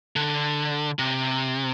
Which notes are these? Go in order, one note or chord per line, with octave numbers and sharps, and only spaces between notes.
D3
C3